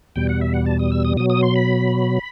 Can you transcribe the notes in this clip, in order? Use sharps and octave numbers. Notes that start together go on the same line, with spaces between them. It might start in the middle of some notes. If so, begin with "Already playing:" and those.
E2 B2 G3 G5
F#5
E5
F#5
A5
D#6
E6
D#6
B2 F#3 D#6
D#6
C6
B5